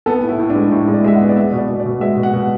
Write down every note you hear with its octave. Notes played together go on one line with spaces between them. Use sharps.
B3 A4
A2
E4
A2
D4
G#3
A2 E4
G#3
D5
G#3 E5
F#5
B3
D5
B3 E5
B2
D5
B2
D5
B2
G#3 E5
B2
F#5
B2